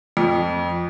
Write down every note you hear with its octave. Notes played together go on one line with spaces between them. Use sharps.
F2